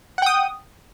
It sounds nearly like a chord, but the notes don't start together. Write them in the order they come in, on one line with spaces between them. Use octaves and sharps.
F#5 G5 D#6